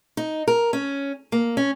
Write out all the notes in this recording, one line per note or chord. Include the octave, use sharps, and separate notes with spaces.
D#4
A#4
C#4
A#3
C#4